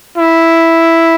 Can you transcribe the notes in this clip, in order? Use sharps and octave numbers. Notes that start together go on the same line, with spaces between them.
E4